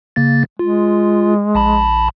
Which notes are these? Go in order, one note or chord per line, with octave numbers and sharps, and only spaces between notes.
C#3 A#3 A6
G#3 F4
A#1 A5 B5